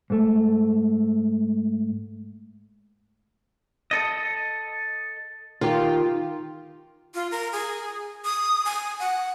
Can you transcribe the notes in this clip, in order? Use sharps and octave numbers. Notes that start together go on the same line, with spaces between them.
G#2 A3
A4 D#5
D#3 F4 G4
F4
A#4
G#4
D#6
G#5
F#5